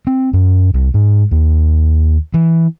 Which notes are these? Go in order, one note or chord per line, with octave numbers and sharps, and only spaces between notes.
C4
F#2
C2
G#2
D#2
E3